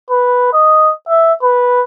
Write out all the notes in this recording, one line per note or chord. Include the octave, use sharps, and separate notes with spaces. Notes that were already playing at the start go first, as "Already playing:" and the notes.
B4
D#5
E5
B4